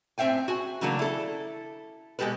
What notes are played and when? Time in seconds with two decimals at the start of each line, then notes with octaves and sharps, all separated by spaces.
0.18 A2 C4 E5 F5 G5 G#5
0.48 F#4 G#5
0.81 C#3 E3 F#3 A3 A#3 D4
0.99 E4 A4
2.19 B2 G#3 G4 A4 B4